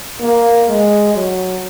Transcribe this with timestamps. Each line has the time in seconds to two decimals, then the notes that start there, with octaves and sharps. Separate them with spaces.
0.20 A#3
0.67 G#3
1.14 F#3